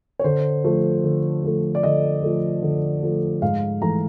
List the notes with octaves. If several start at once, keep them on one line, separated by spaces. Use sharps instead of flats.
C#5
D3 C5
F3 A3
D3
F3 A3
D5
D3 D#5
F3 A3
D3
F3 A3
G#2 F5
E3 A3 A#5